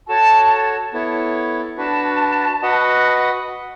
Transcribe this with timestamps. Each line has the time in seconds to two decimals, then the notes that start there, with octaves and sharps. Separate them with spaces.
0.08 F#4 A4 C#5 A5
0.93 B3 E4 A4 C#5
1.78 D4 F#4 B4 A5
2.62 F#4 B4 D#5 F#5